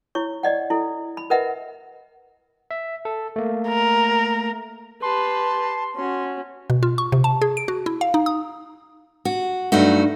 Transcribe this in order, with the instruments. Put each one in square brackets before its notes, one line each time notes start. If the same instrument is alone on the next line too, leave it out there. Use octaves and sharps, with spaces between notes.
[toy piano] E4 C#5 C#6
D5 D#5 F#5
E4 A4
B5
A#4 B4 D#5 E5 F#5 B5
[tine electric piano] E5
A4
A3 A#3
[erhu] A#4
[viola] G4 B4 [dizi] A5 [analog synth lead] C6
[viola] C#4 F#4 [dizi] C6
[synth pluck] B2
F4
C#6
C3
A5
G#4
D7
F#4
E4
F5
D#4
D#6
[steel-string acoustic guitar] F#4
G2 F#3 A3 D#4 F#4